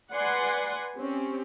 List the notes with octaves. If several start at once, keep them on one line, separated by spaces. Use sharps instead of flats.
B4 D5 F#5 G#5 C6
C4 C#4 G4